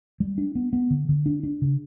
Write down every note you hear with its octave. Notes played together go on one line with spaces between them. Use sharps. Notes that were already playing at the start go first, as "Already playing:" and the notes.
G3
D4
B3
B3
D3
D3
D4
D4
C#3